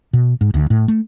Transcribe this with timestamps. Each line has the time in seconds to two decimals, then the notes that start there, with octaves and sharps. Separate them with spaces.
0.13 B2
0.41 G#2
0.54 D2
0.70 A2
0.88 A3